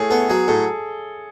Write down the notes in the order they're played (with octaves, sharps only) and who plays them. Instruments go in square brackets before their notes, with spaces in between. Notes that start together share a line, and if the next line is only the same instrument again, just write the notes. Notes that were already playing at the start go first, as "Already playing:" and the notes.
Already playing: [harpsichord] A2 [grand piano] G#4 C#5 E5
[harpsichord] B3 [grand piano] A4
[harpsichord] F#3 [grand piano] G#4
[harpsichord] A2 [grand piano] A4